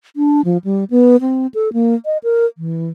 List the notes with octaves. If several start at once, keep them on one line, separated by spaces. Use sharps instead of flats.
D4
F3
G3
B3
C4
A4
A#3
D#5
A#4
E3